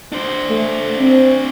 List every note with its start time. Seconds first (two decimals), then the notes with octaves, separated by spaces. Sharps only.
0.12 D4 C5
0.49 A3
0.99 C4